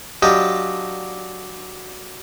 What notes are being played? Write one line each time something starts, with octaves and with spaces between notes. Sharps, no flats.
F#3 D4 F4 G4 D#5